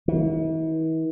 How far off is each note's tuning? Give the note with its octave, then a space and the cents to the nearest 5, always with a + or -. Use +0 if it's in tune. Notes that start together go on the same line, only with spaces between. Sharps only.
E3 -45